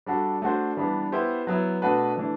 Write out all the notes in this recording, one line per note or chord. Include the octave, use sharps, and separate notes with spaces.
G3 D4 F#4 A4
A3 D4 F#4 C5
E3 G3 B3 D4
B3 E4 G4 C5
F#3 B3 E4
B2 A3 D4 F#4 B4
E3 A3 D4